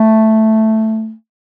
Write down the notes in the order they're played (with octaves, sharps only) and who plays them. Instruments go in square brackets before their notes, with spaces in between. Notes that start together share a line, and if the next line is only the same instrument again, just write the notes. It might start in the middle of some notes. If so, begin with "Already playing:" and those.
Already playing: [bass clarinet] A3